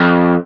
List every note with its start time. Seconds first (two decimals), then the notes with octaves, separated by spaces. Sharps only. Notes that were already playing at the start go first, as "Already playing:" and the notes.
Already playing: F2